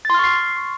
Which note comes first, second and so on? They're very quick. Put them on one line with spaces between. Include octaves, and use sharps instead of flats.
A6 C6 F6 C#6 C7